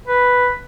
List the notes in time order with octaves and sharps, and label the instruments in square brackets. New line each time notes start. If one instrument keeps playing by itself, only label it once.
[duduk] B4